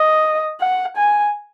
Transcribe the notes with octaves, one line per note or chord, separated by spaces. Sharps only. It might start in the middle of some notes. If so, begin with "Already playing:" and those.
Already playing: D#5
F#5
G#5